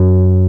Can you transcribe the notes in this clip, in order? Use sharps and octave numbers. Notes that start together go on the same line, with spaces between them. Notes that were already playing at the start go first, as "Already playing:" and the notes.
Already playing: F#2 F#3